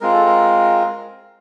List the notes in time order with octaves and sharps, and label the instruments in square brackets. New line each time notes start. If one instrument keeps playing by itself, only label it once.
[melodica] G#3 C4 F4 A#4
A4
A#4